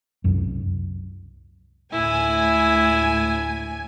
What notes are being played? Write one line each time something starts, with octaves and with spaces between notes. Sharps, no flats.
C2 F#2
D2 A2 E4 G#5